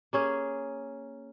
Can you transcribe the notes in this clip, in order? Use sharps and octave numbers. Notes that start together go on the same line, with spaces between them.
A#3 C#4 G#4